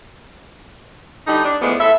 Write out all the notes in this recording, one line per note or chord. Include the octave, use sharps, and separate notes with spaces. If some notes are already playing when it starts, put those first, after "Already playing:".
D3 G3 D#4
D4
E2 F3 G#3 A3 B3
A2 A4 E5